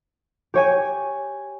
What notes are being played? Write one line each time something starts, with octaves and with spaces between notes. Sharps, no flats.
G4 C#5 G#5